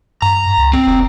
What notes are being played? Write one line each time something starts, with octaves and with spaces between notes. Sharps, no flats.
G2 A#5
C#2
C4
F1